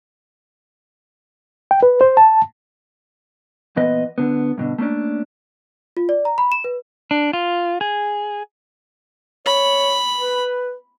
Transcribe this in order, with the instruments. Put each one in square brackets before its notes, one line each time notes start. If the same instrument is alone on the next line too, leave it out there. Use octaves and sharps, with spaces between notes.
[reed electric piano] G5
B4
C5
A5
[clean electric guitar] A#2 E3 B3 B4 D#5
D3 B3
G2 B2 D3
A3 A#3 C#4 D4
[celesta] F4
D5
A#5
B5
E7
B4
[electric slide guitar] D4
F4
G#4
[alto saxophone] C#5 [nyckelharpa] B5
[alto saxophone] B4